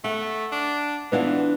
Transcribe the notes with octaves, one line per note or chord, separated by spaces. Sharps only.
A3 F#5
D4
E3 B3 D4 F4 B4 D5 F#5